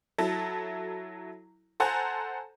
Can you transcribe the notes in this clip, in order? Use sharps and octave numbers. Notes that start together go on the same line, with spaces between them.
F#3 E4 A4
A4 C5 F#5 G#5 A#5